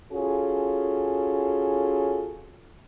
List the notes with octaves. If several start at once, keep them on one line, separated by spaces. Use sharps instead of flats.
C#4 F4 F#4 G#4 A4